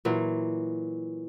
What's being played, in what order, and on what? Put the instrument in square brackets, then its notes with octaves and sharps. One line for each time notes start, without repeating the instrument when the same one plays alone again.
[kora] A#2 E3 F#3